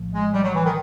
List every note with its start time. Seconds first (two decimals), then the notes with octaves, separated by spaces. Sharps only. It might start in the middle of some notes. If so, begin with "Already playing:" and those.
Already playing: A#1 A2 F3 A3
0.13 G#3
0.33 G3
0.43 F#3
0.54 E3
0.64 D#3